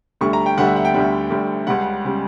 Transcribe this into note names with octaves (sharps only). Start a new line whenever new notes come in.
D2 D3 G3 C#6
A#5
G5
D2 D3 G3 F#5
E5
F#5
G5
D2 D3 G3
D2 D3 G3
C#2 C#3 G3 F#5
C#3 G3